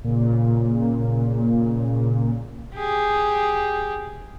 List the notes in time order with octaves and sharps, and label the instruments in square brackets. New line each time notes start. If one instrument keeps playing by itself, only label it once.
[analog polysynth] A#2 C#3
[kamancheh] G4 G#4